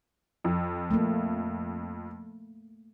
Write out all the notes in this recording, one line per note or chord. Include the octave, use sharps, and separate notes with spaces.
F2
A3 A#3